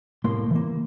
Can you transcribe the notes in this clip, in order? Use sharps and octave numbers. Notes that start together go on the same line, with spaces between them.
C2 A2 A#3 C6
E3 A#3